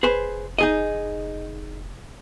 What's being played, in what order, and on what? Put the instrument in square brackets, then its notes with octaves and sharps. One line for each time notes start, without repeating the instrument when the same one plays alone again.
[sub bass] F1 [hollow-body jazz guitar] G#4 B4 C5
[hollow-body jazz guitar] D#4 G#4 D#5